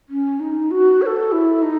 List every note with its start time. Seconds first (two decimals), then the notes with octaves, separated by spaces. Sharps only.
0.09 C#4
0.40 D#4
0.71 F#4
1.02 C#5
1.06 A4
1.32 E4
1.62 D#4